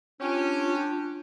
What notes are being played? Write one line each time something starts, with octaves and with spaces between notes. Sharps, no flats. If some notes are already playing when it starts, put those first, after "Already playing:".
C#4 D4 F4 G4